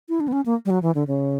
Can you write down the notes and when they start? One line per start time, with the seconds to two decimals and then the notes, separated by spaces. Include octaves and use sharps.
0.09 E4
0.20 D4
0.28 B3
0.33 C#4
0.46 A#3
0.65 G3
0.70 F#3
0.83 E3
0.95 D3
1.07 C#3